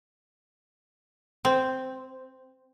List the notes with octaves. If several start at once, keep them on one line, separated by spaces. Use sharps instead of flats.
C4